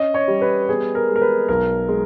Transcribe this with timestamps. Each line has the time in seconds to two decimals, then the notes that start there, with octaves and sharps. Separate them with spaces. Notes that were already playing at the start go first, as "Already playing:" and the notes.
Already playing: C#4 D#5
0.14 C#5
0.28 G3
0.42 B4
0.69 B3 G#4
0.95 A#4
1.09 G#3
1.16 A#4
1.22 B4
1.49 B1 A#4
1.88 G#3